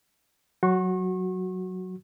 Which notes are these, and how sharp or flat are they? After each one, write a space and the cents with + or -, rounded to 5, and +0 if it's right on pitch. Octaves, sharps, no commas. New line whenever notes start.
F#3 -5 F#4 +0 C#6 -35